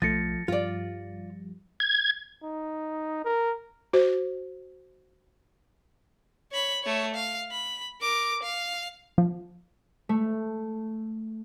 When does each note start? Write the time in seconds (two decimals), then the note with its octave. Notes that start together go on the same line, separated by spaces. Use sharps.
0.02 B1 F3 A3 A6 A#6 C#7
0.48 G2 F3 G3 F4 D5
1.80 G#6
2.43 D#4
3.25 A#4
3.93 F#4 C5
6.52 C#5 B5
6.83 A3 C#5
7.14 F5
7.51 B5
8.01 A#4 D6
8.43 F5
9.18 F3
10.09 A3